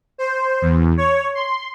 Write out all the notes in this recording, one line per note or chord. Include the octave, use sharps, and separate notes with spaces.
C5
E2
C#5
C6